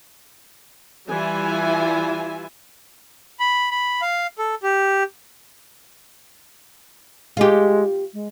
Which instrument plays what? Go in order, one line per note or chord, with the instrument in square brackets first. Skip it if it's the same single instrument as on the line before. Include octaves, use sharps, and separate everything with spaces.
[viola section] E3 G3 E4 F4 E5 G#5
[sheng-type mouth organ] B5
B5
F5
A4
G4
[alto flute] G#3 [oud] F4 G4
[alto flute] G#3